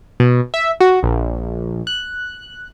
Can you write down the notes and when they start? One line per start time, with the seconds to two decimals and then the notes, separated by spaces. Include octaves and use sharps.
0.20 B2
0.54 E5
0.81 F#4
1.03 A#1
1.87 F#6